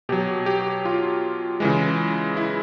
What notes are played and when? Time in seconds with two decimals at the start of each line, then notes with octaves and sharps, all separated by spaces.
0.09 B2 F#3 G4
0.46 G4
0.85 F4
1.60 C#3 E3 G#3
2.37 E4